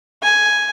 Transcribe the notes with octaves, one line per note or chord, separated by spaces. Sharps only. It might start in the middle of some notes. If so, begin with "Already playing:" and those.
G#5